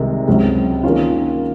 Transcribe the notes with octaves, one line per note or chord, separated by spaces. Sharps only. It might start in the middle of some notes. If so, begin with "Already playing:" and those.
Already playing: C2 C3 D#3 G#3 D#4
C#2 C3 F#3
D#3 A#3 C#4 F4